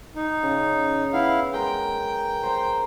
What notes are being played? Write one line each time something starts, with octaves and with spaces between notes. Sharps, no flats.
D#4
C#3
B3 E4 F5
G#3 A#4 G5
C5 A#5 C6